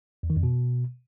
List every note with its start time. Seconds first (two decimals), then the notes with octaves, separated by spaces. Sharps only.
0.23 E2
0.30 D#3
0.37 F2
0.43 B2